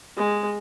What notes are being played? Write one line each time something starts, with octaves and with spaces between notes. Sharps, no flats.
G#3